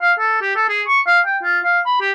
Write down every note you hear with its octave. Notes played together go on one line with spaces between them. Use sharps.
F5
A4
G4
A4
G#4
C#6
F5
G5
F4
F5
B5
G4